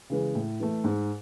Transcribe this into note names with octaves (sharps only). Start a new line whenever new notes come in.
C#3 E3 G#3
A2
E3 A3
G#2